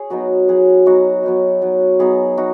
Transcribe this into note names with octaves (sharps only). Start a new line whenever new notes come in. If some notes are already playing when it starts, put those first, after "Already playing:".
Already playing: G#4 C#5
F#3 B3 D#4 F#4
F#3 B3 D#4 G#4
F#3 B3 D#4 F#4
F#3 B3 D#4
F#3 B3 D#4
F#3 B3 D#4 G#4
D#4 F#4